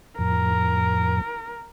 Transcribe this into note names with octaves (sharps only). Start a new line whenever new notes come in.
F2 A2 F3 A#4